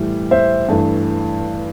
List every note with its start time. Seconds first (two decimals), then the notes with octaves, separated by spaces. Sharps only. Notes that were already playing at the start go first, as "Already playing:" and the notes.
Already playing: A2 E3 G3
0.31 C5 E5
0.69 G2 E3 A3